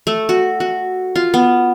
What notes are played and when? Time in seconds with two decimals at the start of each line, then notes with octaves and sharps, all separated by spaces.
0.07 A3
0.29 F#4
0.60 F#4
1.16 F4
1.34 B3